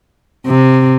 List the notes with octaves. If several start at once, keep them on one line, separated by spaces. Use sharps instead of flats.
C3